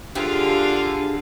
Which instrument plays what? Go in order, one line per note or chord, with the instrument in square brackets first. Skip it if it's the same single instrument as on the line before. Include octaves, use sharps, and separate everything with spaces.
[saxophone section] D3 [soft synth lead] D4 [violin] F4 F5 [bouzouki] G4 G#4